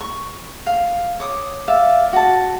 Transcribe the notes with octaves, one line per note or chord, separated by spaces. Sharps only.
C#6
F5
C#5 D6 D#6
D5 E5 F5
F#4 A5